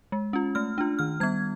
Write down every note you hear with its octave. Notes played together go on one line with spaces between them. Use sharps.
G#3
C#4 F4
A3 F6
D4 F4
D#3 F6
G3 B3 G#6